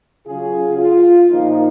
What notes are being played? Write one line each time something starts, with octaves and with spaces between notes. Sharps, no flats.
C#3 F#3 C#4 F4 G#4
F4
A#2 F3 A#3 D#4